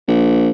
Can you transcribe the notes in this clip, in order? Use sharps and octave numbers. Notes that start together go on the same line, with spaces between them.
A#1